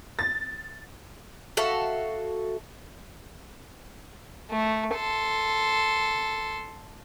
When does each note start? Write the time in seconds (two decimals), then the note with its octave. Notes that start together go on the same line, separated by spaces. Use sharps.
0.19 A6
1.57 F#4 A4 E5 F5
4.51 A3
4.95 A4 C6